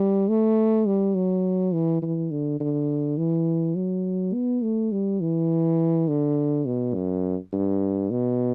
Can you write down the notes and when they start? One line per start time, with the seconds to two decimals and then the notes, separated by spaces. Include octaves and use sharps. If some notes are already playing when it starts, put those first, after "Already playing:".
Already playing: G3
0.29 A3
0.86 G3
1.15 F#3
1.73 E3
2.02 E3
2.31 D3
2.60 D3
3.18 E3
3.75 F#3
4.34 B3
4.63 A3
4.92 G3
5.21 E3
6.08 D3
6.65 B2
6.94 F#2
7.53 G2
8.10 B2